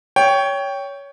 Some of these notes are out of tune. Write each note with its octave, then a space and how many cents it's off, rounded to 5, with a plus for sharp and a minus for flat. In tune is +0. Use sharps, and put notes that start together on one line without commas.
C#5 +15 G5 +0